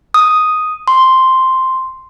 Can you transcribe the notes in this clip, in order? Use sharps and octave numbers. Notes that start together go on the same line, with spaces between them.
D#6
C6